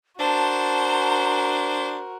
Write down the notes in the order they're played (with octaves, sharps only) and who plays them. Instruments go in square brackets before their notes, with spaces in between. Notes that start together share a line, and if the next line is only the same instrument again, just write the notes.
[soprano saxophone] D4 [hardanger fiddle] F#4 A#4 [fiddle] C5 [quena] A5